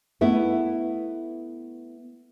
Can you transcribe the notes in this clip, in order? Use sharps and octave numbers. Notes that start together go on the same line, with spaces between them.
A3 B3 E4